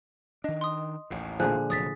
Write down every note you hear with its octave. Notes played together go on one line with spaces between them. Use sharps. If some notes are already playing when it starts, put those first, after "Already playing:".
D#3 D4 D#5
C6 D#6
A1 D#2 A2
A#2 D3 F3 G#4 G#5 F#6
F1 F#3 D#6 A6 B6